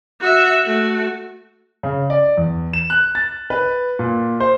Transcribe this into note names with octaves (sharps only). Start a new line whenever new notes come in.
F#4 E5
A3 F#4
C#3
D5
E2
E7
F#6
A6
B4
A#2
C5